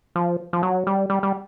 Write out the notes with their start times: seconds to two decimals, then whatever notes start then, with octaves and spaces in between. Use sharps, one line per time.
0.16 F3
0.53 F3
0.63 F#3
0.87 G3
1.10 G3
1.23 G3